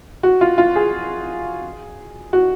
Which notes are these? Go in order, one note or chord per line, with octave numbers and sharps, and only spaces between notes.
F#4
F4
F4
G#4
F#4